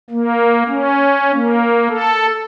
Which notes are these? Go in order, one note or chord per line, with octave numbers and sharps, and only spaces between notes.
A#3
C#4
A#3
A4